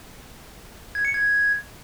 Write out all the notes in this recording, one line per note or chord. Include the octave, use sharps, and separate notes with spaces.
G#6
C#7
G#6